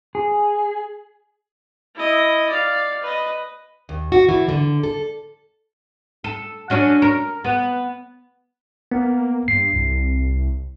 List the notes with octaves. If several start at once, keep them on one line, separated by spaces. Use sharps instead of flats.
G#4
E4 D#5
D5 F5
B4 D#5
D#2
F#4
E3
D3
A4
A4
F#3 C#4 D4
A#4
B3
A#3 B3
G2 C7
C2